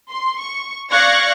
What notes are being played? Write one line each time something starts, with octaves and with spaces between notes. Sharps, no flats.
C6
C#6
D5 F5 C#6 F#6 G#6 A#6